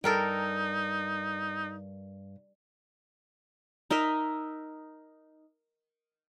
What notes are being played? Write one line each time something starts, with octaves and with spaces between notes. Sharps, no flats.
G2 D#4 A4 A#4 G5
D#4 A#4 D#5 E5